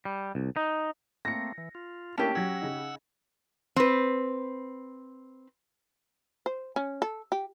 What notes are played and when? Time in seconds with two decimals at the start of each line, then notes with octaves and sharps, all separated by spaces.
0.05 G3
0.35 C2
0.56 D#4
1.25 A3 A#3 C4 A#6 C#7
1.58 E3
1.75 F4
2.18 A3 A#3 C#4 D4 E4 G4 A5
2.35 F#3 F#5 E6 G#6
2.62 C#3 D#4
3.76 C4 B4
6.46 C5
6.76 C#4
7.02 A4
7.32 G4